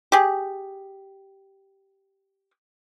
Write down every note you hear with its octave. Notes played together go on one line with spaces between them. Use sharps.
G4 G#4